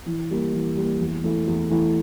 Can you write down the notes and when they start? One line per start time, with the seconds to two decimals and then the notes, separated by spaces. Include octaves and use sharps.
0.06 E3
0.31 G3 A#3
0.53 E3
0.77 G3 A#3
1.00 E2
1.24 E3 A3 E4
1.47 E2
1.70 E3 A3 E4